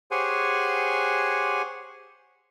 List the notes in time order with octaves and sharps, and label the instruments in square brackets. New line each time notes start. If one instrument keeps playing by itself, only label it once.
[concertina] G4 G#4 C5 C#5 F#5 G#5